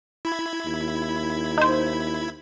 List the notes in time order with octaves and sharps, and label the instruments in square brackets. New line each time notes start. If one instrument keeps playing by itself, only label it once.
[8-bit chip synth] E4 B5 G#6
[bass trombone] D#2
[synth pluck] D#4 C5